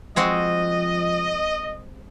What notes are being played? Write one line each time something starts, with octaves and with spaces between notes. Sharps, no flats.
F3 G#3 C4 F#4 D#5